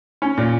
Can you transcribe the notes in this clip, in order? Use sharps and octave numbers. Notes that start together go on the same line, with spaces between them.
C#4
A#2